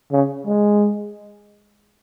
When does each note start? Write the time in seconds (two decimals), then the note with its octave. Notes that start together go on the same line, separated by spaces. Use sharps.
0.12 C#3
0.46 G#3